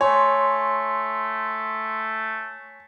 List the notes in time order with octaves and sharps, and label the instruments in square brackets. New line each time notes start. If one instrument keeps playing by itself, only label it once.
[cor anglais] A3 [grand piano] C#5 [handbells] G#5 [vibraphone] C6